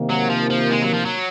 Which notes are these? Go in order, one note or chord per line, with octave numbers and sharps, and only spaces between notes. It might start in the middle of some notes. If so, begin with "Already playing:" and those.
Already playing: C3 D#3 A#3
F#3
F3
F3
G#3
F#3
F3
F#3